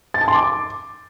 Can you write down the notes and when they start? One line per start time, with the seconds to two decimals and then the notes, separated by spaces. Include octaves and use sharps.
0.14 A6
0.21 A5
0.28 C6
0.35 D6